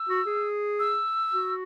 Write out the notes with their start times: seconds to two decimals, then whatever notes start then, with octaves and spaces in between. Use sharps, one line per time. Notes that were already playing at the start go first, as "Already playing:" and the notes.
Already playing: E6
0.09 F#4
0.26 G#4
0.79 E6
1.33 F#4